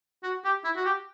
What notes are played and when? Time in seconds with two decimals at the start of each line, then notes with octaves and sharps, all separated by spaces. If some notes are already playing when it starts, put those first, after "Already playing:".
0.23 F#4
0.44 G4
0.64 E4
0.76 F#4
0.85 G4